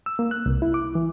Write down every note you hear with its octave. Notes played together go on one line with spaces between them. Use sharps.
E6
A#3
F#6
C2
E4
D6
E3